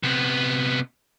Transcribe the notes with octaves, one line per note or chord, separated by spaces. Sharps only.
C3 B3